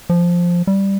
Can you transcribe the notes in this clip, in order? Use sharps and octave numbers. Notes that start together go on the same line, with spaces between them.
F3
G3